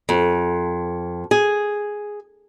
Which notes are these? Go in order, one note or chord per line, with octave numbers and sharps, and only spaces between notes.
F2
G#4